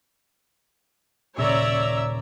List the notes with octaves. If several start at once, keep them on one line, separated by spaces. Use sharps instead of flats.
D#1 C#3 C#5 D5 E5 A#5 E6